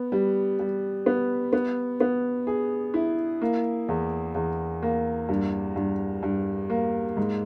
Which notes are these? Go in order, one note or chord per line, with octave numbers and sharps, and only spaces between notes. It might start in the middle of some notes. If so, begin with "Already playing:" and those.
Already playing: B3
G3
G3
B3
B3
B3
G#4
E4
A#3
E2
E2
A#3
G2
G2
G2
A#3
G#2